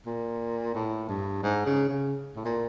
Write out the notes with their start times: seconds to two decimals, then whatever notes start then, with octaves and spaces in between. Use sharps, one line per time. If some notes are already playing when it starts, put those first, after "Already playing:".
0.06 A#2
0.75 A2
1.09 G2
1.43 G#2
1.66 C#3
1.89 C#3
2.36 A2
2.45 A#2